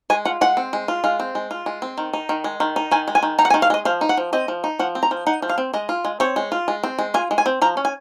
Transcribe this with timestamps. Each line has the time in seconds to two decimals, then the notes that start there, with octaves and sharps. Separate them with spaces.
0.10 G#3 G#5
0.25 F4 F#5
0.41 G#3 F#5
0.57 C4
0.73 G#3
0.88 F4
1.04 G#3 F5
1.20 C4
1.35 G#3
1.51 F4
1.66 G#3
1.82 C4
1.98 D#3
2.13 D#4
2.29 D#3
2.44 G#3
2.60 D#3
2.76 D#4
2.91 D#3 G#5
3.08 G#3
3.15 G#5
3.23 D#3
3.39 D#4 A#5
3.45 F#5
3.50 G#5
3.54 D#3
3.62 F5
3.70 G#3 D#5
3.85 F3 F5
4.01 D#4
4.09 F#5
4.17 F3
4.33 C4 D#5
4.48 F3
4.64 D#4
4.79 F3 F#5
4.95 C4
5.03 A#5
5.11 F3
5.26 D#4 F#5
5.42 F3
5.49 F5
5.58 C4
5.74 G#3 D#5
5.89 F4
6.05 G#3
6.20 C4 C#5
6.36 G#3
6.52 F4
6.68 G#3
6.83 C4
6.99 G#3
7.14 F4 G#5
7.31 G#3
7.38 G#5
7.46 C4
7.62 F3 A#5
7.77 C#4
7.85 G#5